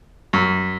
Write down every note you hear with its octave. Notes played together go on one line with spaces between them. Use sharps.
F#2